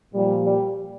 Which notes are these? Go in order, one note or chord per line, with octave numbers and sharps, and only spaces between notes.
A#2 F3 G3
G3